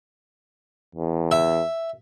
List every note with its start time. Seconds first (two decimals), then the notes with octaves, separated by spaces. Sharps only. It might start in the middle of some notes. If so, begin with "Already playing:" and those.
0.95 E2
1.31 E5